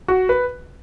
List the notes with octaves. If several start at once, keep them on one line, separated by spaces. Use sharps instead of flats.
F#4
B4